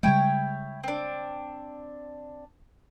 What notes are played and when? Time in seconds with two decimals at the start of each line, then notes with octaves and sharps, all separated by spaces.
0.03 C#3 G3 G#3 E4 C#5 G5
0.84 C4 D4